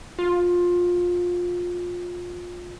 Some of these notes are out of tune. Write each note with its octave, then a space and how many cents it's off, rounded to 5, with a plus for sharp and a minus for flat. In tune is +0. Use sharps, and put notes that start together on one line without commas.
F4 +20